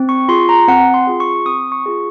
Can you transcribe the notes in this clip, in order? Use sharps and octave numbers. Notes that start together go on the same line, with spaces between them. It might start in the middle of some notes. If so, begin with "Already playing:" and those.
Already playing: C4
C#6
F4 G#4 C6
A#5
C4 F#5
C6
F4 G#4
C#6
C4 D#6
C#6
F4 G#4